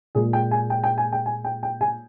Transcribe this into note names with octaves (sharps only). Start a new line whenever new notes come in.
A#2 G#3 G#4
G5
G#5
G5
G5
G#5
G5
G#5
G5
G5
G#5